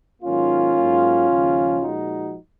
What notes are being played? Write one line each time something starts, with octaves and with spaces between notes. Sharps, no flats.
G#2 D#3 F#3 A#3 C#4 F4
G#2 F#3 A#3
D#2 C#3 F3 G#3
A#2 F3 G#3 D#4 F#4